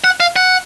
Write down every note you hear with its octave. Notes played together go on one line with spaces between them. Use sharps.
F#5
F5
F#5